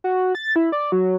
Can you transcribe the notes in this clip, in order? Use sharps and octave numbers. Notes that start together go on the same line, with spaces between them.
F#4
A6
E4
D5
F#3